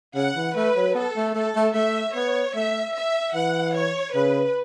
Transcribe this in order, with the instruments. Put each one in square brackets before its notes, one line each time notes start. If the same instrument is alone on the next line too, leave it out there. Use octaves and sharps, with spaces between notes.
[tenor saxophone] C#3 [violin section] F#5
[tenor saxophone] E3
[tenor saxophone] A3 [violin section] B4
[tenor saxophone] F#3
[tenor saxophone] B3 [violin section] A4
[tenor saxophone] A3
[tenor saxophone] A3 [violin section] A4
[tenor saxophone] A3
[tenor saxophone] A3 [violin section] E5
[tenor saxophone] B3 [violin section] C#5
[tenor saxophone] A3 [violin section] E5
[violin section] E5
[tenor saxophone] E3 [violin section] F#5
[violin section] C#5
[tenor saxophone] C#3 [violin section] B4